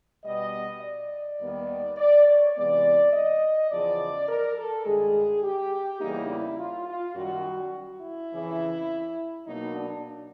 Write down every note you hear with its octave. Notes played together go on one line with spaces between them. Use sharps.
B2 G3 B3 D#5
D5
D#2 D#3 G3 B3
D5
C#5
C3 E3 G#3 B3 D5
D#5
E2 C#3 F3 D5
A#4
A4
G2 D#3 G#3 G#4
G4
E2 C#3 E3 G3 A#3 D#4
E4
F4
F4
F#2 D#3 G3 F#4
E4
F2 C#3 E3
B2 F#3 A#3 D#4
D4